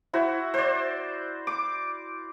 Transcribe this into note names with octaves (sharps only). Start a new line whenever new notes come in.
E4 F#4 C5
C5 D5
D6